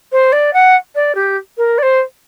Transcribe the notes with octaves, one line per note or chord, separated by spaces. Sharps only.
C5
D5
F#5
D5
G4
A#4
D5
C5